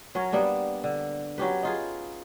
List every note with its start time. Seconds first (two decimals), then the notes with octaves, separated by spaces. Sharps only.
0.15 F#3 C#4 A#4 C#5
0.33 G3 A#3 B3 D4
0.84 D3
1.38 F#3 C#4 G4 B4
1.63 D#4 F4 G#4